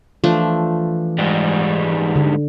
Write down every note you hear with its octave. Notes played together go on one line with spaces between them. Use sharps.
E3 F3 A3 D4
G#2 G3
D3